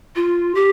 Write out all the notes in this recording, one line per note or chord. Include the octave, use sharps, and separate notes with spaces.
F4
G4